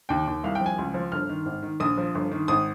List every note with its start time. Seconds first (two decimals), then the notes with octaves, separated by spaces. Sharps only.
0.09 D#2 G5
0.27 D#2
0.44 C2 F5
0.55 G5
0.61 F3
0.66 G#5
0.78 C#2
0.94 F3
1.12 G1 F6
1.29 D#3
1.46 G#1
1.62 D#3
1.80 A#1 D#6
1.98 F3
2.15 G1
2.31 D#3
2.48 G#1 D#6